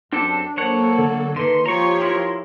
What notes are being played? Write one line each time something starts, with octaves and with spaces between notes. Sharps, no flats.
F#2 C4 D4 G4 A4
F#3 A#3 A4 A#4 C5 C#5 F#5 A5
D3
D3 D#3 B4 C6
F3 F4 G4 C#5 A#5 C#6
E4 A#4